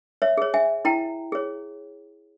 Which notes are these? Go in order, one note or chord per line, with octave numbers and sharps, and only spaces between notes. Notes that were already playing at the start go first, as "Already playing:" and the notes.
C#5 E5
G#4 C#5
E5 G#5
E4 G5 A#5
G#4 C#5